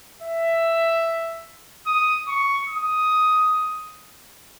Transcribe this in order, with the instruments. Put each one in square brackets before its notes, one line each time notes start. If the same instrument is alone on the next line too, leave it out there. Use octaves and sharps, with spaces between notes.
[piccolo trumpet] E5
D#6
C#6
D#6